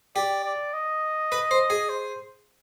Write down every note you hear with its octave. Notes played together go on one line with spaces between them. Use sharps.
G4 D5
D5
D#5
B4
C5
G#4
C5